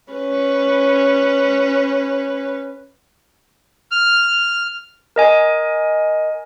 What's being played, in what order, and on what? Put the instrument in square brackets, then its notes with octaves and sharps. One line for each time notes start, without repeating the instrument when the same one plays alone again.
[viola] C#4 B4
[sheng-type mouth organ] F6
[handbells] A#4 D#5 G#5